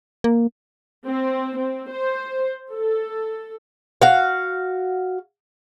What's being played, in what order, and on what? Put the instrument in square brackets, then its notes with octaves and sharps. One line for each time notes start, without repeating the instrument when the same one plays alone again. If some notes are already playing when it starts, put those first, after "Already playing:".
[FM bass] A#3
[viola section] C4
C4
C5
A4
[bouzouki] F#4 F5